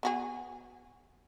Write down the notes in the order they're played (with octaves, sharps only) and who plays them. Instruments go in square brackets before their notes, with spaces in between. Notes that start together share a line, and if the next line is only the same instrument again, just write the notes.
[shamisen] B3 F#4 G#4